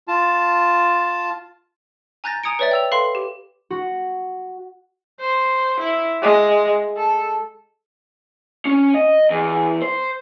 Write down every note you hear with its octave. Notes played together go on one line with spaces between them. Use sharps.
F4 A5
G#5 A#5 F#6 G6 A6 A#6
G#5 A#5 D#6 G#6 C#7 D7
B4 C#5 D5 E5 A6
G5 E6 F7
A4 B4 F5 B5 C6 C7
G4
F#4
C5
E4
G#3
A4
C#4 C#5
D#5
E2
C5